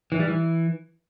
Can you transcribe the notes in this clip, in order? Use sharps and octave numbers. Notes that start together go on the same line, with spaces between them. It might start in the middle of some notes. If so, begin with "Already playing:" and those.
E3
G3
E3